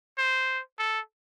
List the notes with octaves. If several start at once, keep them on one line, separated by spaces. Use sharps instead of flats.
C5
A4